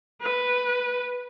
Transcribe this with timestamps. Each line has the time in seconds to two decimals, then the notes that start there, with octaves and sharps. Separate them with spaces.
0.22 B4